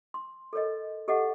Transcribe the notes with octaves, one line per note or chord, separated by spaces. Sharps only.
C6
A4 A#4 C#5 D#5
G4 A4 D#5 E5 F#5